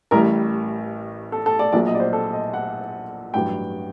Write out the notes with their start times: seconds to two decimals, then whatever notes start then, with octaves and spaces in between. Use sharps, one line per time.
0.11 A1 A2 G3 A#4
1.32 A4
1.46 A4
1.59 D5
1.72 A#1 A#2 F#3 D5
1.87 D#5
1.95 D5
2.00 C5
2.13 A4
2.33 D#5
2.54 F#5
3.34 A1 G2 F#3 G5